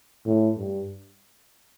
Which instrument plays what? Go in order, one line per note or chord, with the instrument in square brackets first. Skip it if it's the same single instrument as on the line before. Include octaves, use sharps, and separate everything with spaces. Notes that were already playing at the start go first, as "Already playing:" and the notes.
[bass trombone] A2
G2